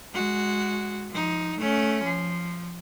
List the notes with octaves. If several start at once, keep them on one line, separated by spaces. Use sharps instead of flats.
G#3 F#4
F3 D#4
A3 C#4
F3